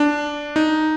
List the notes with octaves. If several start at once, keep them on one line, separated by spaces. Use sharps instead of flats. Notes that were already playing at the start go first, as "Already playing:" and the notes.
Already playing: D4
D#4